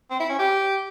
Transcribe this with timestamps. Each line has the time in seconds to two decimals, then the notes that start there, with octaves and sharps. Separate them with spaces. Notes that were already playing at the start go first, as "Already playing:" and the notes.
0.11 C4
0.20 E4
0.30 C#4
0.39 G4